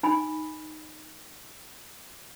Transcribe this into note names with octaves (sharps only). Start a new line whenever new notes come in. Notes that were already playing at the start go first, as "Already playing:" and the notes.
D#4 G#5 B5